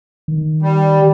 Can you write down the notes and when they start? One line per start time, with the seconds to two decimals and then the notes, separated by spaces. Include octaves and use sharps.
0.28 D#3
0.62 G3